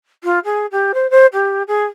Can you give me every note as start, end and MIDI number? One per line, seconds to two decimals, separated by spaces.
0.23 0.39 65
0.44 0.66 68
0.71 0.92 67
0.94 1.09 72
1.10 1.26 72
1.33 1.62 67
1.67 1.84 68